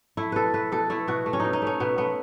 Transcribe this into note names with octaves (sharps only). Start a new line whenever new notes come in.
A3 E4
B2 A4 B4
A3 B4
B2 A4
A3 E4
B2 F#4
A3
C#4
B2 D#4
D#4
A3 C#4
B2 B3
A3 B3